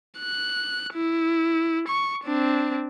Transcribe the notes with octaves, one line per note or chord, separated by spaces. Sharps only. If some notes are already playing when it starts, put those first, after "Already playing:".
F#6
E4
C#6
C4 D4